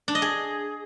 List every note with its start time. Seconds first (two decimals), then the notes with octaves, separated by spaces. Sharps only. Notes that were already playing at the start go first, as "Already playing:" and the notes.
0.08 D4
0.15 D#5
0.22 G#4